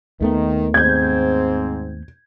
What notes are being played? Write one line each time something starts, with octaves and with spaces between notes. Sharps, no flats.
D#2 D#3 A3 B3
G#2 C4 G6 G#6